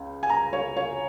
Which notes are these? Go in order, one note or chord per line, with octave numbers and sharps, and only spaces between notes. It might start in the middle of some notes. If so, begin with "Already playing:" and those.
Already playing: C#2 C#3
G#5
A#5
C#5
C#5